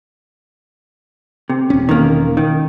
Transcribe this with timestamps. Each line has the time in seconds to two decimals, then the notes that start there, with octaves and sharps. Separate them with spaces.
1.50 C3
1.70 E1 C#4
1.89 D#3 A#3
2.37 D#3